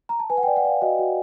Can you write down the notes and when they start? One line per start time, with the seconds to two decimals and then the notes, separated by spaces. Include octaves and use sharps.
0.09 A#5
0.20 A5
0.30 B4 G#5
0.37 F#5
0.43 D5 G5
0.56 F#5
0.64 D5 F5
0.82 F#4 D#5
0.99 F#4